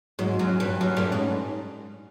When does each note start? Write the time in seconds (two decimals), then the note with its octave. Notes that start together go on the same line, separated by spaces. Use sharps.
0.19 G#2 F#3
0.34 F#3
0.39 F#2
0.50 F#3
0.60 G2
0.65 F#3
0.81 F#2 F#3
0.96 G2 A3
1.11 G#2 C#4